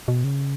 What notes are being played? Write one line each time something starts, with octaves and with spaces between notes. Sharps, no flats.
B2
C#3